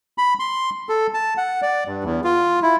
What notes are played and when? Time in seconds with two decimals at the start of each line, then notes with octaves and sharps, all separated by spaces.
0.18 B5
0.39 C6
0.89 A4
1.14 A5
1.37 F#5
1.62 D5
1.87 G2
2.04 E2
2.24 F4
2.62 E4